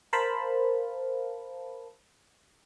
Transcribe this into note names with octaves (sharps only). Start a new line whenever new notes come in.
A#4 C5 F5 A5 B5